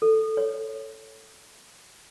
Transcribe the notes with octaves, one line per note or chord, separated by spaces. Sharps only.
A4
C#5